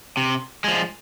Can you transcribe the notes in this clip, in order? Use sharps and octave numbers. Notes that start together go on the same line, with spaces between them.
C3
F3 G#3